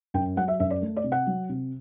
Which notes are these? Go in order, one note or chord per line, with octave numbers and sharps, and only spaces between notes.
F#2 G5
F#3 F#5
E5
F#2 E5
D5
A3
D5
C3
F#5
F#3
C3